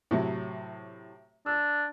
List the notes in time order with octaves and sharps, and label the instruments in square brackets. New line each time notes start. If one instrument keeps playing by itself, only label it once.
[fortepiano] A2 C3 F#3
[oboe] D4 [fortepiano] E6